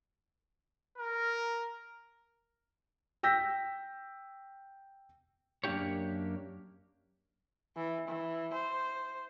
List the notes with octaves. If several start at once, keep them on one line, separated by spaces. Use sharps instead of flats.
A#4
G5 E6 G6 A#6 B6
F#2 A#3 D4 E4 G4 C#5
E3
E3
C5